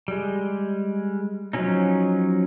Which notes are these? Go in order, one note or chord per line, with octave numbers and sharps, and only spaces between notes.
G3 G#3
F3 F#3 C#4 D#4